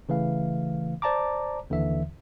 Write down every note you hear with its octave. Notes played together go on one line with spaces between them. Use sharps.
C#3 E3 A3 F5
C5 D5 A5 A#5 D6
D#2 D3 E3 E5